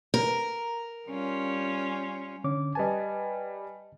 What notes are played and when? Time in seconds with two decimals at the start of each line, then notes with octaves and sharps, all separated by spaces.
0.14 A#4
1.09 G3 C#4 F4
2.44 D3 C#4 D6
2.75 G3 B4 D#5 G#5 A5